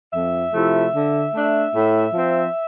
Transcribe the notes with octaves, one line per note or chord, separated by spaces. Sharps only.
F2 E5
C3 F3 A3 E4
D3
A3 D4
A2
F3 C4